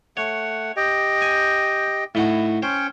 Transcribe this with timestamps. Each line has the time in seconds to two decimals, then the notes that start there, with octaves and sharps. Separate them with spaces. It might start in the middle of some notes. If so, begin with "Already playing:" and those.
0.17 A3 C#5 F#5
0.77 G4 D#5 G5
1.22 G#5
2.15 A2 D#4 E4 F#4
2.63 C#4 C5 C#5 G5